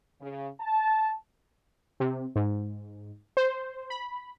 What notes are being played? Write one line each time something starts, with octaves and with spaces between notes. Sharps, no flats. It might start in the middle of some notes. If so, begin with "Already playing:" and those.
C#3
A5
C3
G#2
C5
B5